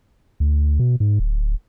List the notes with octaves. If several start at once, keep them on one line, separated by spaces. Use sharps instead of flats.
D2
B2
G#2
D1